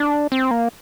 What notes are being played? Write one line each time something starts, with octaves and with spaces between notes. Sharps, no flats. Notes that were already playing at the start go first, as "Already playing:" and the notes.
Already playing: D4
C4
A#3